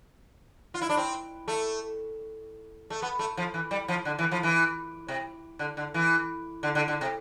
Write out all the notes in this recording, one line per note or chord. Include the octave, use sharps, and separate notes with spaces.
F4
E4
D4
C4
A3
A3
B3
A3
F3
E3
G3
F3
D3
E3
F3
E3
C3
D3
D3
E3
D3
D3
D3
C3